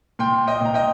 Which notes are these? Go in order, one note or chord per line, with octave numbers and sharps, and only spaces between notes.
A#2 G5 C6
D#5 G5
A#2 A#5
D#5 G5